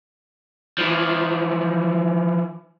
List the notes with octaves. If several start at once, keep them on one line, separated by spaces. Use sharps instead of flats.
E3 F3